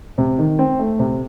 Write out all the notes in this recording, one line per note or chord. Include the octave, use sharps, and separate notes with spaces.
C3
D#3
C4
A3
C3